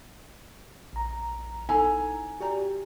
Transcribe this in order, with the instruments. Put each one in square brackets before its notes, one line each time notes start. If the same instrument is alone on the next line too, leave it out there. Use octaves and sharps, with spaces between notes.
[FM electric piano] A#1 A#5
[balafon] D#4 E4 A4 [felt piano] G#5
[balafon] F#4 D5 A#5 [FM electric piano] G4